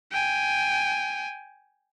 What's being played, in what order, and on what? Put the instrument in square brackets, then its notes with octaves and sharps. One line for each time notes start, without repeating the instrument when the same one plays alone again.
[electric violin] G5 G#5